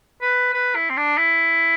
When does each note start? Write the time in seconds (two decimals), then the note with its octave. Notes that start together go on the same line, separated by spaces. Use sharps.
0.22 B4
0.54 B4
0.76 E4
0.90 C4
0.97 D4
1.18 E4